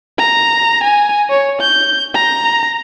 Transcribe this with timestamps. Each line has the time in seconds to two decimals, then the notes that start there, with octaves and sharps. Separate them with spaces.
0.18 A#5
0.83 G#5
1.30 C#5
1.61 G6
2.14 A#5